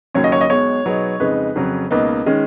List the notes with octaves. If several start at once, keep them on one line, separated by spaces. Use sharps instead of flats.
D#2 C#3 F#3 C#4 F#4 C#5
D#5
C#5
D#5
B1 B2 G#3 C#5
B2 F#3 B3 D#4 G#4
F2 C#3 G#3 D#4 B4
F2 C#3 F#3
C#2 B2 A#3 D#4 B4
D#3 G#3 C#4